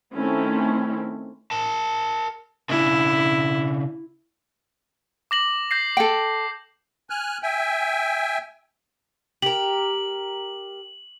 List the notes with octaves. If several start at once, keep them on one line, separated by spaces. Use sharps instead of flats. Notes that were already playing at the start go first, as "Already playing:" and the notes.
D#3 A3 C4 C#4 E4
A#4 A5
C#3 D4 E4
D6 A#6 F#7
G6 A#6 C7
A4 G5
G#5 F6 F#6
E5 G5 G#5
G4 A#4 F#7